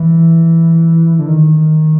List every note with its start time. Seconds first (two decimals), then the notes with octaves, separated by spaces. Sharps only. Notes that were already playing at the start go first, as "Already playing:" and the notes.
Already playing: E3
1.19 D3
1.28 D#3